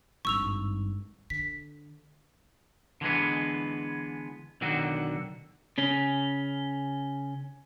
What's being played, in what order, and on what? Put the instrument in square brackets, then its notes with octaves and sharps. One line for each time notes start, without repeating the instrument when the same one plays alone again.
[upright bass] G#1 G2 [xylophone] C#6 E6 F7
[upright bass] D3 [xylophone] B6
[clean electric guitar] D3 E3 G#3 B3
B1 D3 D#3 F#4
C#3 C#4